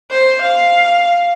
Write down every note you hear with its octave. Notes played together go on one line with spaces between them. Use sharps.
C5
F5